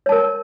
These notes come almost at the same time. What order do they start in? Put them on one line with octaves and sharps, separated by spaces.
C#5 A5 A#4